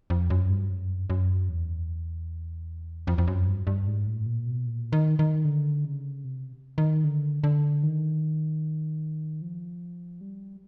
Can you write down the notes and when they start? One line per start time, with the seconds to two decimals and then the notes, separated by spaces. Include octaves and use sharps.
0.10 F2
0.30 F#2
0.50 G2
0.70 F#2
1.10 F#2
1.49 E2
3.07 F2
3.18 F2
3.27 F#2
3.47 G2
3.67 G2
3.87 G#2
4.07 A2
4.26 A#2
4.46 B2
4.66 A#2
4.92 D#3
5.19 D#3
5.45 D3
5.85 C#3
6.25 C3
6.78 D#3
7.04 D3
7.44 D3
7.83 D#3
9.42 F3
10.21 G3